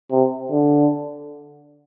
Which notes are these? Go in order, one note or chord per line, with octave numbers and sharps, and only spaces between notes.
C3
D3